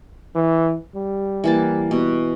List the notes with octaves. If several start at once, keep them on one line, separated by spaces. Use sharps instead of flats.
E3
G3
E3 A#3 A5
B2